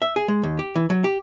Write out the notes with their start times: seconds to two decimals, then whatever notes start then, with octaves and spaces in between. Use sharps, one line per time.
0.02 E5
0.16 G#4
0.28 G#3
0.43 D#2
0.59 G4
0.75 E3
0.90 F#3
1.04 G4